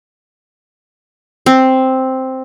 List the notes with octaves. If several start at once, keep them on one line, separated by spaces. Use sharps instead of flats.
C4